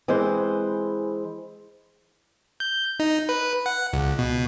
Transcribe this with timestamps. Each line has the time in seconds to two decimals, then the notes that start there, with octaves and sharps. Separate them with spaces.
0.08 E3 G#3 C4 B4 C5
2.60 G6
3.00 D#4
3.29 B4
3.66 F#5
3.93 C#2
4.18 B2